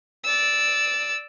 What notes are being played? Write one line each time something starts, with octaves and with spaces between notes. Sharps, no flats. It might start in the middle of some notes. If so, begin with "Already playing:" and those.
D5 E6